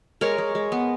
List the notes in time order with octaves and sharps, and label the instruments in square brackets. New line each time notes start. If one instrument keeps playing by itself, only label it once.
[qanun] G#3 A#4 C#5
G#3
G#3
B3